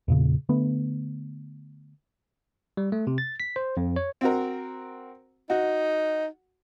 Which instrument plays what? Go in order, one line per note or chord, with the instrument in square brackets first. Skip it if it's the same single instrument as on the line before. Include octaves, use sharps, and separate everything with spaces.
[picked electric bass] E2 A#2 C#3
D3 A3 B3
[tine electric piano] G3
A3
C3
A6
B6
C5
F2
C#5
[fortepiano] C4 F#4 A#4
[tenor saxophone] D#4 [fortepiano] F#4